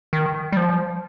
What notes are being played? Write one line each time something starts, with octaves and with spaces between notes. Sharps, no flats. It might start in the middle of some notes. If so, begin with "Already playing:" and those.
D#3
G3
F3